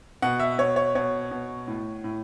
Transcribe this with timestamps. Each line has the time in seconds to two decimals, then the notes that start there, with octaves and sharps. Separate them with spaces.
0.22 B2 F#5
0.40 E5
0.58 B2 C#5
0.76 C#5
0.95 B2 C#5
1.31 B2
1.68 A2
2.04 A2